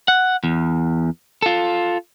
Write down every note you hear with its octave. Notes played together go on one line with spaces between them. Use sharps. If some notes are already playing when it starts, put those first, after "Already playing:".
F#5
E2
F4 A4